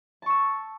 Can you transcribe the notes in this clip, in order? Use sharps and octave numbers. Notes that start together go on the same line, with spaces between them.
A5 C#6 E6